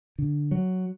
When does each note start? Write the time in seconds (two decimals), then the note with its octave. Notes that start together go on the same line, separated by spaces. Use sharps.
0.19 D3
0.51 F#3